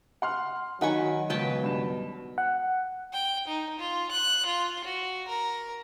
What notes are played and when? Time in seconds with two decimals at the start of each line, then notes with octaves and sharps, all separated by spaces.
0.22 F#5 C6 F6
0.81 D#3 F#3 D#4 F#5 G#5 B5 C#6
1.30 C#2 B2 F#3 B4 G5 A5
1.63 G2 E7
2.38 F#5
3.13 G5
3.48 D#4
3.79 F4
4.12 F#6
4.47 F4
4.85 F#4
5.28 A#4